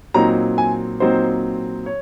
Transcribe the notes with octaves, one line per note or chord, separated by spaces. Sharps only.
A#2 F#3 C4 D#4 A#5
G#5
A#2 F#3 C4 D#4 C5
C#5